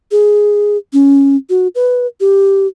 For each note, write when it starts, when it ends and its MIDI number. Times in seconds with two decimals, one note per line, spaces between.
0.11 0.77 68
0.93 1.36 61
1.50 1.68 66
1.75 2.07 71
2.20 2.67 67